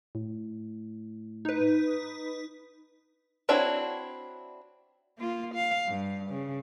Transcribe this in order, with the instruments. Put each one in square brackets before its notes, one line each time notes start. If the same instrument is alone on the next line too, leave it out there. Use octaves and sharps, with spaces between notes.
[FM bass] A2
[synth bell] D#4 B4
[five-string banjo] C4 D4 E4 F#4 C#5
[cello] A#3 F4
F5
G2
C#3